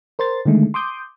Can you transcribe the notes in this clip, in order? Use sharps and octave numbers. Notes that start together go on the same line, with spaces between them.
A#4 C5 C6 A6
D3 D#3 G#3 A3
C6 D6 D#6 G6